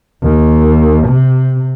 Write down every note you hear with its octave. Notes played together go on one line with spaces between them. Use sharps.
D#2
C3